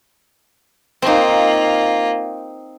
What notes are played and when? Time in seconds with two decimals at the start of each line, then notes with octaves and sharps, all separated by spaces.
1.02 A#3 C4 D#4 F4